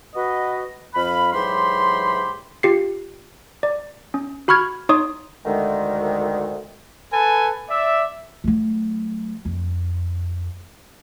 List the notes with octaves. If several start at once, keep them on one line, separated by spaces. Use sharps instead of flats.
F#4 B4 D#5
F2 F5 B5
G#2 E3 F#3 G4 B5 C6
F4 G4 C7
D5
C#4
F#4 B5 C#6 F6 G#6
D#4 C#5 D#5 C6 D#6
D2 D#3 G#3
A4 B4 G#5
D5 E5
F#3 A3
F2